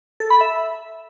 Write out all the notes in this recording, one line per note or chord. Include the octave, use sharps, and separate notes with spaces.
A4
B5
E5